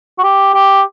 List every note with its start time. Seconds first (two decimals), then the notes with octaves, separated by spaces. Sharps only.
0.19 F#4
0.23 G4
0.54 G4